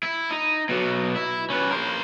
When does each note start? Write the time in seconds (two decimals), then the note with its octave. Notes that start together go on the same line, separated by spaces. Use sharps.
0.03 E4
0.31 D#4
0.69 B2 F#3
1.16 E4
1.50 C#4 B4
1.71 A#4 C5